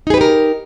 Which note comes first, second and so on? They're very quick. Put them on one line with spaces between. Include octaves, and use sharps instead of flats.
D#4 G#4 B4 G4 A#4